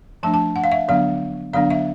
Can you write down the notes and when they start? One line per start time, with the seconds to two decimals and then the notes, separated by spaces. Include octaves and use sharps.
0.23 F3 A3 D4 A5
0.34 A5
0.56 F#5
0.64 F5
0.72 E5
0.88 D3 F#3 B3 D4 F5
1.53 D3 F#3 B3 D4 F5
1.70 E5